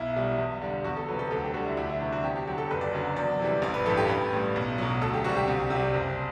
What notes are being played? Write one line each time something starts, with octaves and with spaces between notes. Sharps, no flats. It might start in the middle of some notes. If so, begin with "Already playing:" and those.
Already playing: B1 E4
B2 G3
E2
D3 G3
E2 F#4
A4
C3 F#3 B4
A4
D2 A4
G4
D3 G3 F#4
E4
D2 E4
E4
C3 G3 D4
F#4
E2 G4
G4
D3 F#3 G4
A4
F#1 B4
D5
F#2 D3 F#3 D5
E2 D5
C3 E3 G3
A1 D5
B4
G2 E3 A4
G4
A1 B4
A2 G3
B1
B2 F#3
D2 A4
G4
C3 G3 F#4
G4
C2
C3 G3
F#1